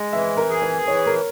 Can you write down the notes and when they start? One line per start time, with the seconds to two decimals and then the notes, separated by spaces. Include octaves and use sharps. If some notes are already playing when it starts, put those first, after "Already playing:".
Already playing: G#3
0.12 E3 E5
0.37 A#4
0.49 G#4
0.62 B4
0.87 E3 C#5
1.06 A#4